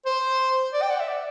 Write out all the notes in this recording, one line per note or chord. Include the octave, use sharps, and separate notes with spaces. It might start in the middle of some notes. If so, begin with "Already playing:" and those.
C5
D5
G5
F#5
E5
D5